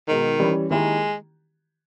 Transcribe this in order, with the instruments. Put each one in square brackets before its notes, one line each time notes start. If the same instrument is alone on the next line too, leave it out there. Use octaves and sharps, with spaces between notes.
[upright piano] B2 G#3 D#4 [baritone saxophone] D#3
[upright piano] E3 G3 C#4
[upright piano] D#3 A#3 E4 G4 [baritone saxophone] G#3